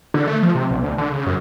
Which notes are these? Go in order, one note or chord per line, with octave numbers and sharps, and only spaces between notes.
D3
A3
F3
C3
B1
D2
D3
C#3
F#2